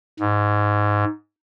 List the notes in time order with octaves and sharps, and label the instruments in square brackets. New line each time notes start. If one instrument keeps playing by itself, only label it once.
[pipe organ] G#2